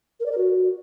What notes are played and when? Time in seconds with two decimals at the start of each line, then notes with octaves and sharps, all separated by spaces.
0.20 A#4
0.26 D5
0.32 A#4
0.38 F#4